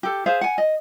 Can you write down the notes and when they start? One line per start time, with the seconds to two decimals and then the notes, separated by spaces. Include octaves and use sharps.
0.03 G4 A4
0.26 G#4 C5 E5 F5
0.41 F#5 G#5
0.58 D#5